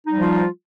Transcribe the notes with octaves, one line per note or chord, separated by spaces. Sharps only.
F3 G3 D#4 F4